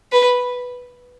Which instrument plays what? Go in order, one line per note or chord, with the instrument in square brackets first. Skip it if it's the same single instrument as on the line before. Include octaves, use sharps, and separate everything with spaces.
[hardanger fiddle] B4